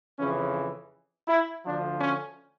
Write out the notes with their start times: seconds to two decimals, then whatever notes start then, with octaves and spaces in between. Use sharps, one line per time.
0.18 F2 C#3 E3 C#4
1.28 E4
1.65 D2 D3 F3 D4
2.01 C#4